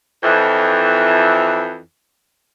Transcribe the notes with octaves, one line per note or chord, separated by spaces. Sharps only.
F2 E3